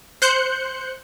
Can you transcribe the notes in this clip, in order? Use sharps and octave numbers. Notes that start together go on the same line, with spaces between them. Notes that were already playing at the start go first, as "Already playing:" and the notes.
C5 F#6 G6 C#7